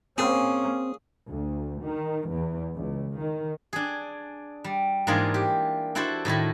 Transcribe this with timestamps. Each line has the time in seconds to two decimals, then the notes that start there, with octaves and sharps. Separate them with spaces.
0.18 A#3 C4 C#4 G#4
1.28 D2
1.83 D#3
2.31 E2
2.75 C#2
3.17 D#3
3.73 D4 G#4
4.64 G3
5.07 G#2 E3 A#3 D4 F4 G#4
5.34 G4
5.95 D4 E4 F#4 A4 C5
6.25 A2 D#3 A3 E4